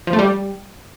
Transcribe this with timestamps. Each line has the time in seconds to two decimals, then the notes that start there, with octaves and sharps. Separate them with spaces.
0.07 F3
0.13 A3
0.19 G3